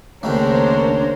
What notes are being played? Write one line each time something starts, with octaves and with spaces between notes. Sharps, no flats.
C#2 D#3 A3 A#3 D4 A#4 C5 C#5